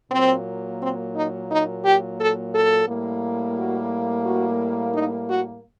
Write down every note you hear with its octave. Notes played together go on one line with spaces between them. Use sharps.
A#2 F#3 A#3 C4
C4
D#4
D#4
G4
A4
A4
A2 G3 A#3
F#4
F#4
D#4
F#4